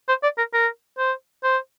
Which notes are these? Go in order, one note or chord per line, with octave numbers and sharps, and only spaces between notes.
C5
D5
A#4
A#4
C5
C5